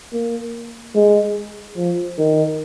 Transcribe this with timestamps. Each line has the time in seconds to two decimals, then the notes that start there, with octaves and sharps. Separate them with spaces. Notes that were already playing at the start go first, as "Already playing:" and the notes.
0.12 A#3
0.95 G#3
1.77 F3
2.18 D#3